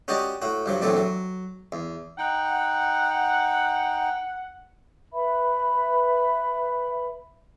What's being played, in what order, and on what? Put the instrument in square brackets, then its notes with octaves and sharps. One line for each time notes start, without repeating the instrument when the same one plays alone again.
[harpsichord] C#4 F#4 G4 D5 D#5
A2 F#4
G2 F3 F#3
A#1 E2 F#3 A3 C4 D5
F#3
E2
[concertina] D#4 G5 [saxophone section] F#5
[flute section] B4 E5 B5